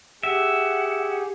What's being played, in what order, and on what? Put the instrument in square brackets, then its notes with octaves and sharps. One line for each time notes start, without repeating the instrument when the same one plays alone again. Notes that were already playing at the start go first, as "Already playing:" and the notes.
[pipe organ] G4 G#4 [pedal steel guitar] E5 [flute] F#5